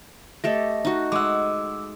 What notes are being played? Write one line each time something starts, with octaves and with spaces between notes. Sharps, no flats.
A3 G4 A4 D#5 A#6
D#4 F#4
G#3 F#5 D6 E6